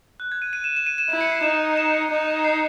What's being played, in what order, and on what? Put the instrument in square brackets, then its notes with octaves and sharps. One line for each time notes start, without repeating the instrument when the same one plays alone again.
[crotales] F#6
G#6
D#7
D#7
E7
E7
D#7
E7
[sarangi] E4 [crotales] D#7
[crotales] C#7
C7
[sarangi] D#4 [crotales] E7
[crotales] E7
C#7
[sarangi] D#4
[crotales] C7